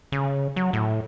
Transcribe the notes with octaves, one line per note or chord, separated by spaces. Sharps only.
C#3
F#3
A2